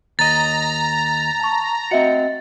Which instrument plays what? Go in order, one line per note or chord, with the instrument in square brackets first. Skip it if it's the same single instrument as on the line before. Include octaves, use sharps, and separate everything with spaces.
[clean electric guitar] D#2 D#5 [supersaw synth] A#5 [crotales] A6
[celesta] A5 C#6
[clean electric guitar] C4 F#5 [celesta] F#4 D#5 E5